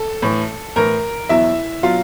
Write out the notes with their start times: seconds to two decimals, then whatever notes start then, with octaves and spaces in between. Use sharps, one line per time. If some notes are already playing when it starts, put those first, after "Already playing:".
Already playing: A4
0.22 A2 E3
0.76 A2 E3 A#4 A#5
1.29 E2 B2 F#3 E4 E5
1.83 B2 F#3 F4 F5